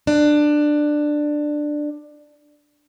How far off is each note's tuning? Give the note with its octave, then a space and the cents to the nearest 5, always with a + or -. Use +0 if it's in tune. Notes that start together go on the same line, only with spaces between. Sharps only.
D4 +15